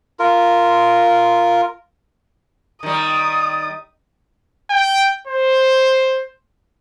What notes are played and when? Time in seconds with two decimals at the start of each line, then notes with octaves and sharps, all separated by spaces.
0.19 F4 A#4
2.83 D#3 G3 D#6
4.70 G5
5.27 C5